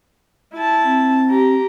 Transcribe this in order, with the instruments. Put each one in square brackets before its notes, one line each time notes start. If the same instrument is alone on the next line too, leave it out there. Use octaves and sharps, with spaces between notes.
[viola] E4 A5
[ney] C4
[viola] G4 A#5